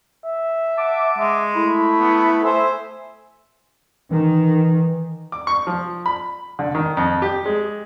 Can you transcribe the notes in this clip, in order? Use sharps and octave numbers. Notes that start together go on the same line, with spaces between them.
E5
F#5 A5 D6
G#3 E5
A3 E4 B5
B3
C5 E5 G#5
D#3 E3
D6
C#6
F3
B5
D3
D#3
F2
G4
G#3